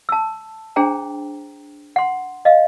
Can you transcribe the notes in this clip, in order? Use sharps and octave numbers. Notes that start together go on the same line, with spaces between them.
A5 E6
D4 G#4 C5 G5 A#5
F#5 C6
D#5 F5